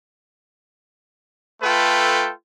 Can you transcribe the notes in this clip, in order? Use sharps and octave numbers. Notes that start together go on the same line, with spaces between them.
A3 F4 A4 B4 G5